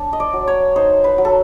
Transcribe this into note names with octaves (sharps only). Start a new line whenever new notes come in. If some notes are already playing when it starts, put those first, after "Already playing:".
Already playing: D4
D#5
D5
F#3
C#5
D#4 C5
B4
F#3
A4